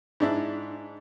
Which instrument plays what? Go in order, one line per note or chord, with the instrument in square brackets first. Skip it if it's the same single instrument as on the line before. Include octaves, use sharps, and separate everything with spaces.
[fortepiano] G#2 D4 E4